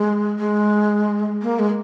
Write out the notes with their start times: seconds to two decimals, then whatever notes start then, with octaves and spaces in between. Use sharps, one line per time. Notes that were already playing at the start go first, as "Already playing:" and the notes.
Already playing: G#3
0.39 G#3
1.42 A#3
1.59 G#3